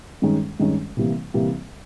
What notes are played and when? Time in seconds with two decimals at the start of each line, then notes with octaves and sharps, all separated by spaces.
0.22 G2 D#3 G#3 C#4
0.60 G2 D#3 G#3 C#4
0.97 C3 E3 G3 A#3
1.34 C3 E3 G3 A#3